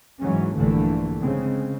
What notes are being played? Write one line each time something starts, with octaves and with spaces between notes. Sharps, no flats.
G#2 E3 F#3 C#4
A#1 G2 D3 E3 A3
C#3 G#3 C4